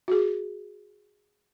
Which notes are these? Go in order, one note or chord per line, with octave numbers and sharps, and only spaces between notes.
F#4 G#4